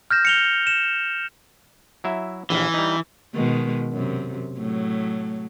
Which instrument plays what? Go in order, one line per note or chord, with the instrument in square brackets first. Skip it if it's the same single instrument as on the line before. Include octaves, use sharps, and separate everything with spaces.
[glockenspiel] F6 G6 A#6 E7
C#7 F7 G7
E7
[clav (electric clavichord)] F#3 E4 E5
[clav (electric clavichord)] A#1 D#2 F5 [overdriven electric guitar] E3
[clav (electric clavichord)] G3 D#4
[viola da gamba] B2 D#3 G#3
F#2 C3
A2 F#3